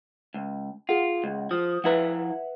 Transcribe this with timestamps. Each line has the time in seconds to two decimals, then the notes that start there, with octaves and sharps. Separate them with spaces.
0.34 C#2
0.89 F4 G#4 F#5
1.24 C#2
1.51 F3 D#6
1.84 F3 E4 B4 E5 F#5 A#5